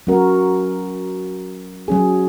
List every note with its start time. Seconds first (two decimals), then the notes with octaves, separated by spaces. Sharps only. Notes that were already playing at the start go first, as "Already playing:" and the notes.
0.07 F#3 C#4 F#4 A#4
1.88 F#3 C#4 G#4